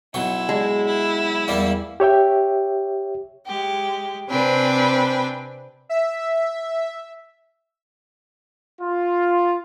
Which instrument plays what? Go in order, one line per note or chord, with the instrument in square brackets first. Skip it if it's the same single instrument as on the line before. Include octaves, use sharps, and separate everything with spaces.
[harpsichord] B1 F#3 C#6 [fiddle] E4
[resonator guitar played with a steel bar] G#3
[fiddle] E4
[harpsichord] E2 G3 A#3
[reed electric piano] G4 C#5 E5 G5
[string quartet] G#3 G4
C3 C4 D4 B4 G5 G#5
[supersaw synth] E5
[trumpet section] F4